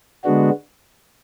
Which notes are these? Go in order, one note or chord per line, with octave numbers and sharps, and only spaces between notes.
D3 G#3 B3 D4 F#4